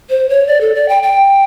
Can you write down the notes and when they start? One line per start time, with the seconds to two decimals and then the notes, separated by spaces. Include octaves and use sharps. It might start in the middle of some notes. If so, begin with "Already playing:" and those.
0.10 C5
0.29 C#5
0.47 D5
0.61 A4
0.75 D5
0.89 G5
1.03 G5